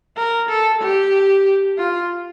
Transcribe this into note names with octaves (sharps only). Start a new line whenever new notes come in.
A#4
A4
G4
F4